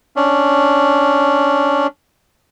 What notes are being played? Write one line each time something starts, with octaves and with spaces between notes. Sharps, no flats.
C#4 D4